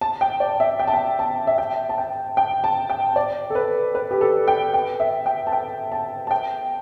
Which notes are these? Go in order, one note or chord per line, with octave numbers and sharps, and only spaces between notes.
A5
G5
D5
E5
G5
A5
G5
A5
E5
G5
A5
G5
G5
A5
G5
D5
A4
B4
B4
G4
A4
G5
G5
E5
G5
A5
G5
A5
A5
G5